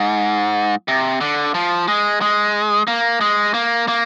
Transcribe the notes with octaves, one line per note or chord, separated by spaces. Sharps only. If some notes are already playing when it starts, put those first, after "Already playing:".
Already playing: G#2
C3
D3
F3
G#3
G#3
A#3
G#3
A#3
A#3